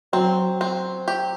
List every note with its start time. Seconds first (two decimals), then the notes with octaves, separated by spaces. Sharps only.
0.13 F#3 C4
0.61 C4
1.08 G4